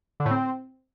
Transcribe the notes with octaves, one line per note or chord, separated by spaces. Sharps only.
D3
A2
C4